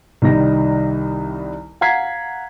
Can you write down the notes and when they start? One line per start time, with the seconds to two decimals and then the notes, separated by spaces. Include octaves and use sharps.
0.22 C2 D#3 G3 D#4 A#6
1.81 F5 F#5 A#5 G#6 B6 C7